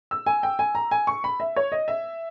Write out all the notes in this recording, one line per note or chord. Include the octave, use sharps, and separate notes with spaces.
E6
G#5
G5
G#5
A#5
G#5
C#6
B5
E5
C#5
D#5
E5